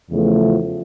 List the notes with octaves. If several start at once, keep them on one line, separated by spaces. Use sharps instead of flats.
E2 C#3 F3 A3